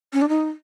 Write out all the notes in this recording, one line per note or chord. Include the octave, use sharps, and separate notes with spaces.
C#4
D4
D#4